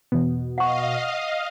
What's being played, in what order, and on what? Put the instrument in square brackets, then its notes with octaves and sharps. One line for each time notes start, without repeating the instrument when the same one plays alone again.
[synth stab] E2 B3 [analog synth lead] B2
[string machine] D#5 F5 [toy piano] F#5 C#6